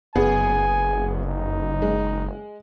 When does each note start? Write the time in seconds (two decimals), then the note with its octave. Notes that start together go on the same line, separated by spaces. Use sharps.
0.15 F#1 B3 G#4 G#5
1.27 D#4
1.82 G#3